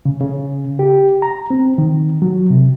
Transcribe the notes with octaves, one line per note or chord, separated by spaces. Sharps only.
C#3
C#3
G4
A#5
C4
D#3
F#3
C3